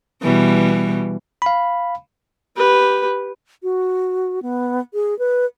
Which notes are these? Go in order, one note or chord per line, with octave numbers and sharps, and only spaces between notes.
B2 E3 G3
F5 B5
G4 B4
F#4
B3
G#4
B4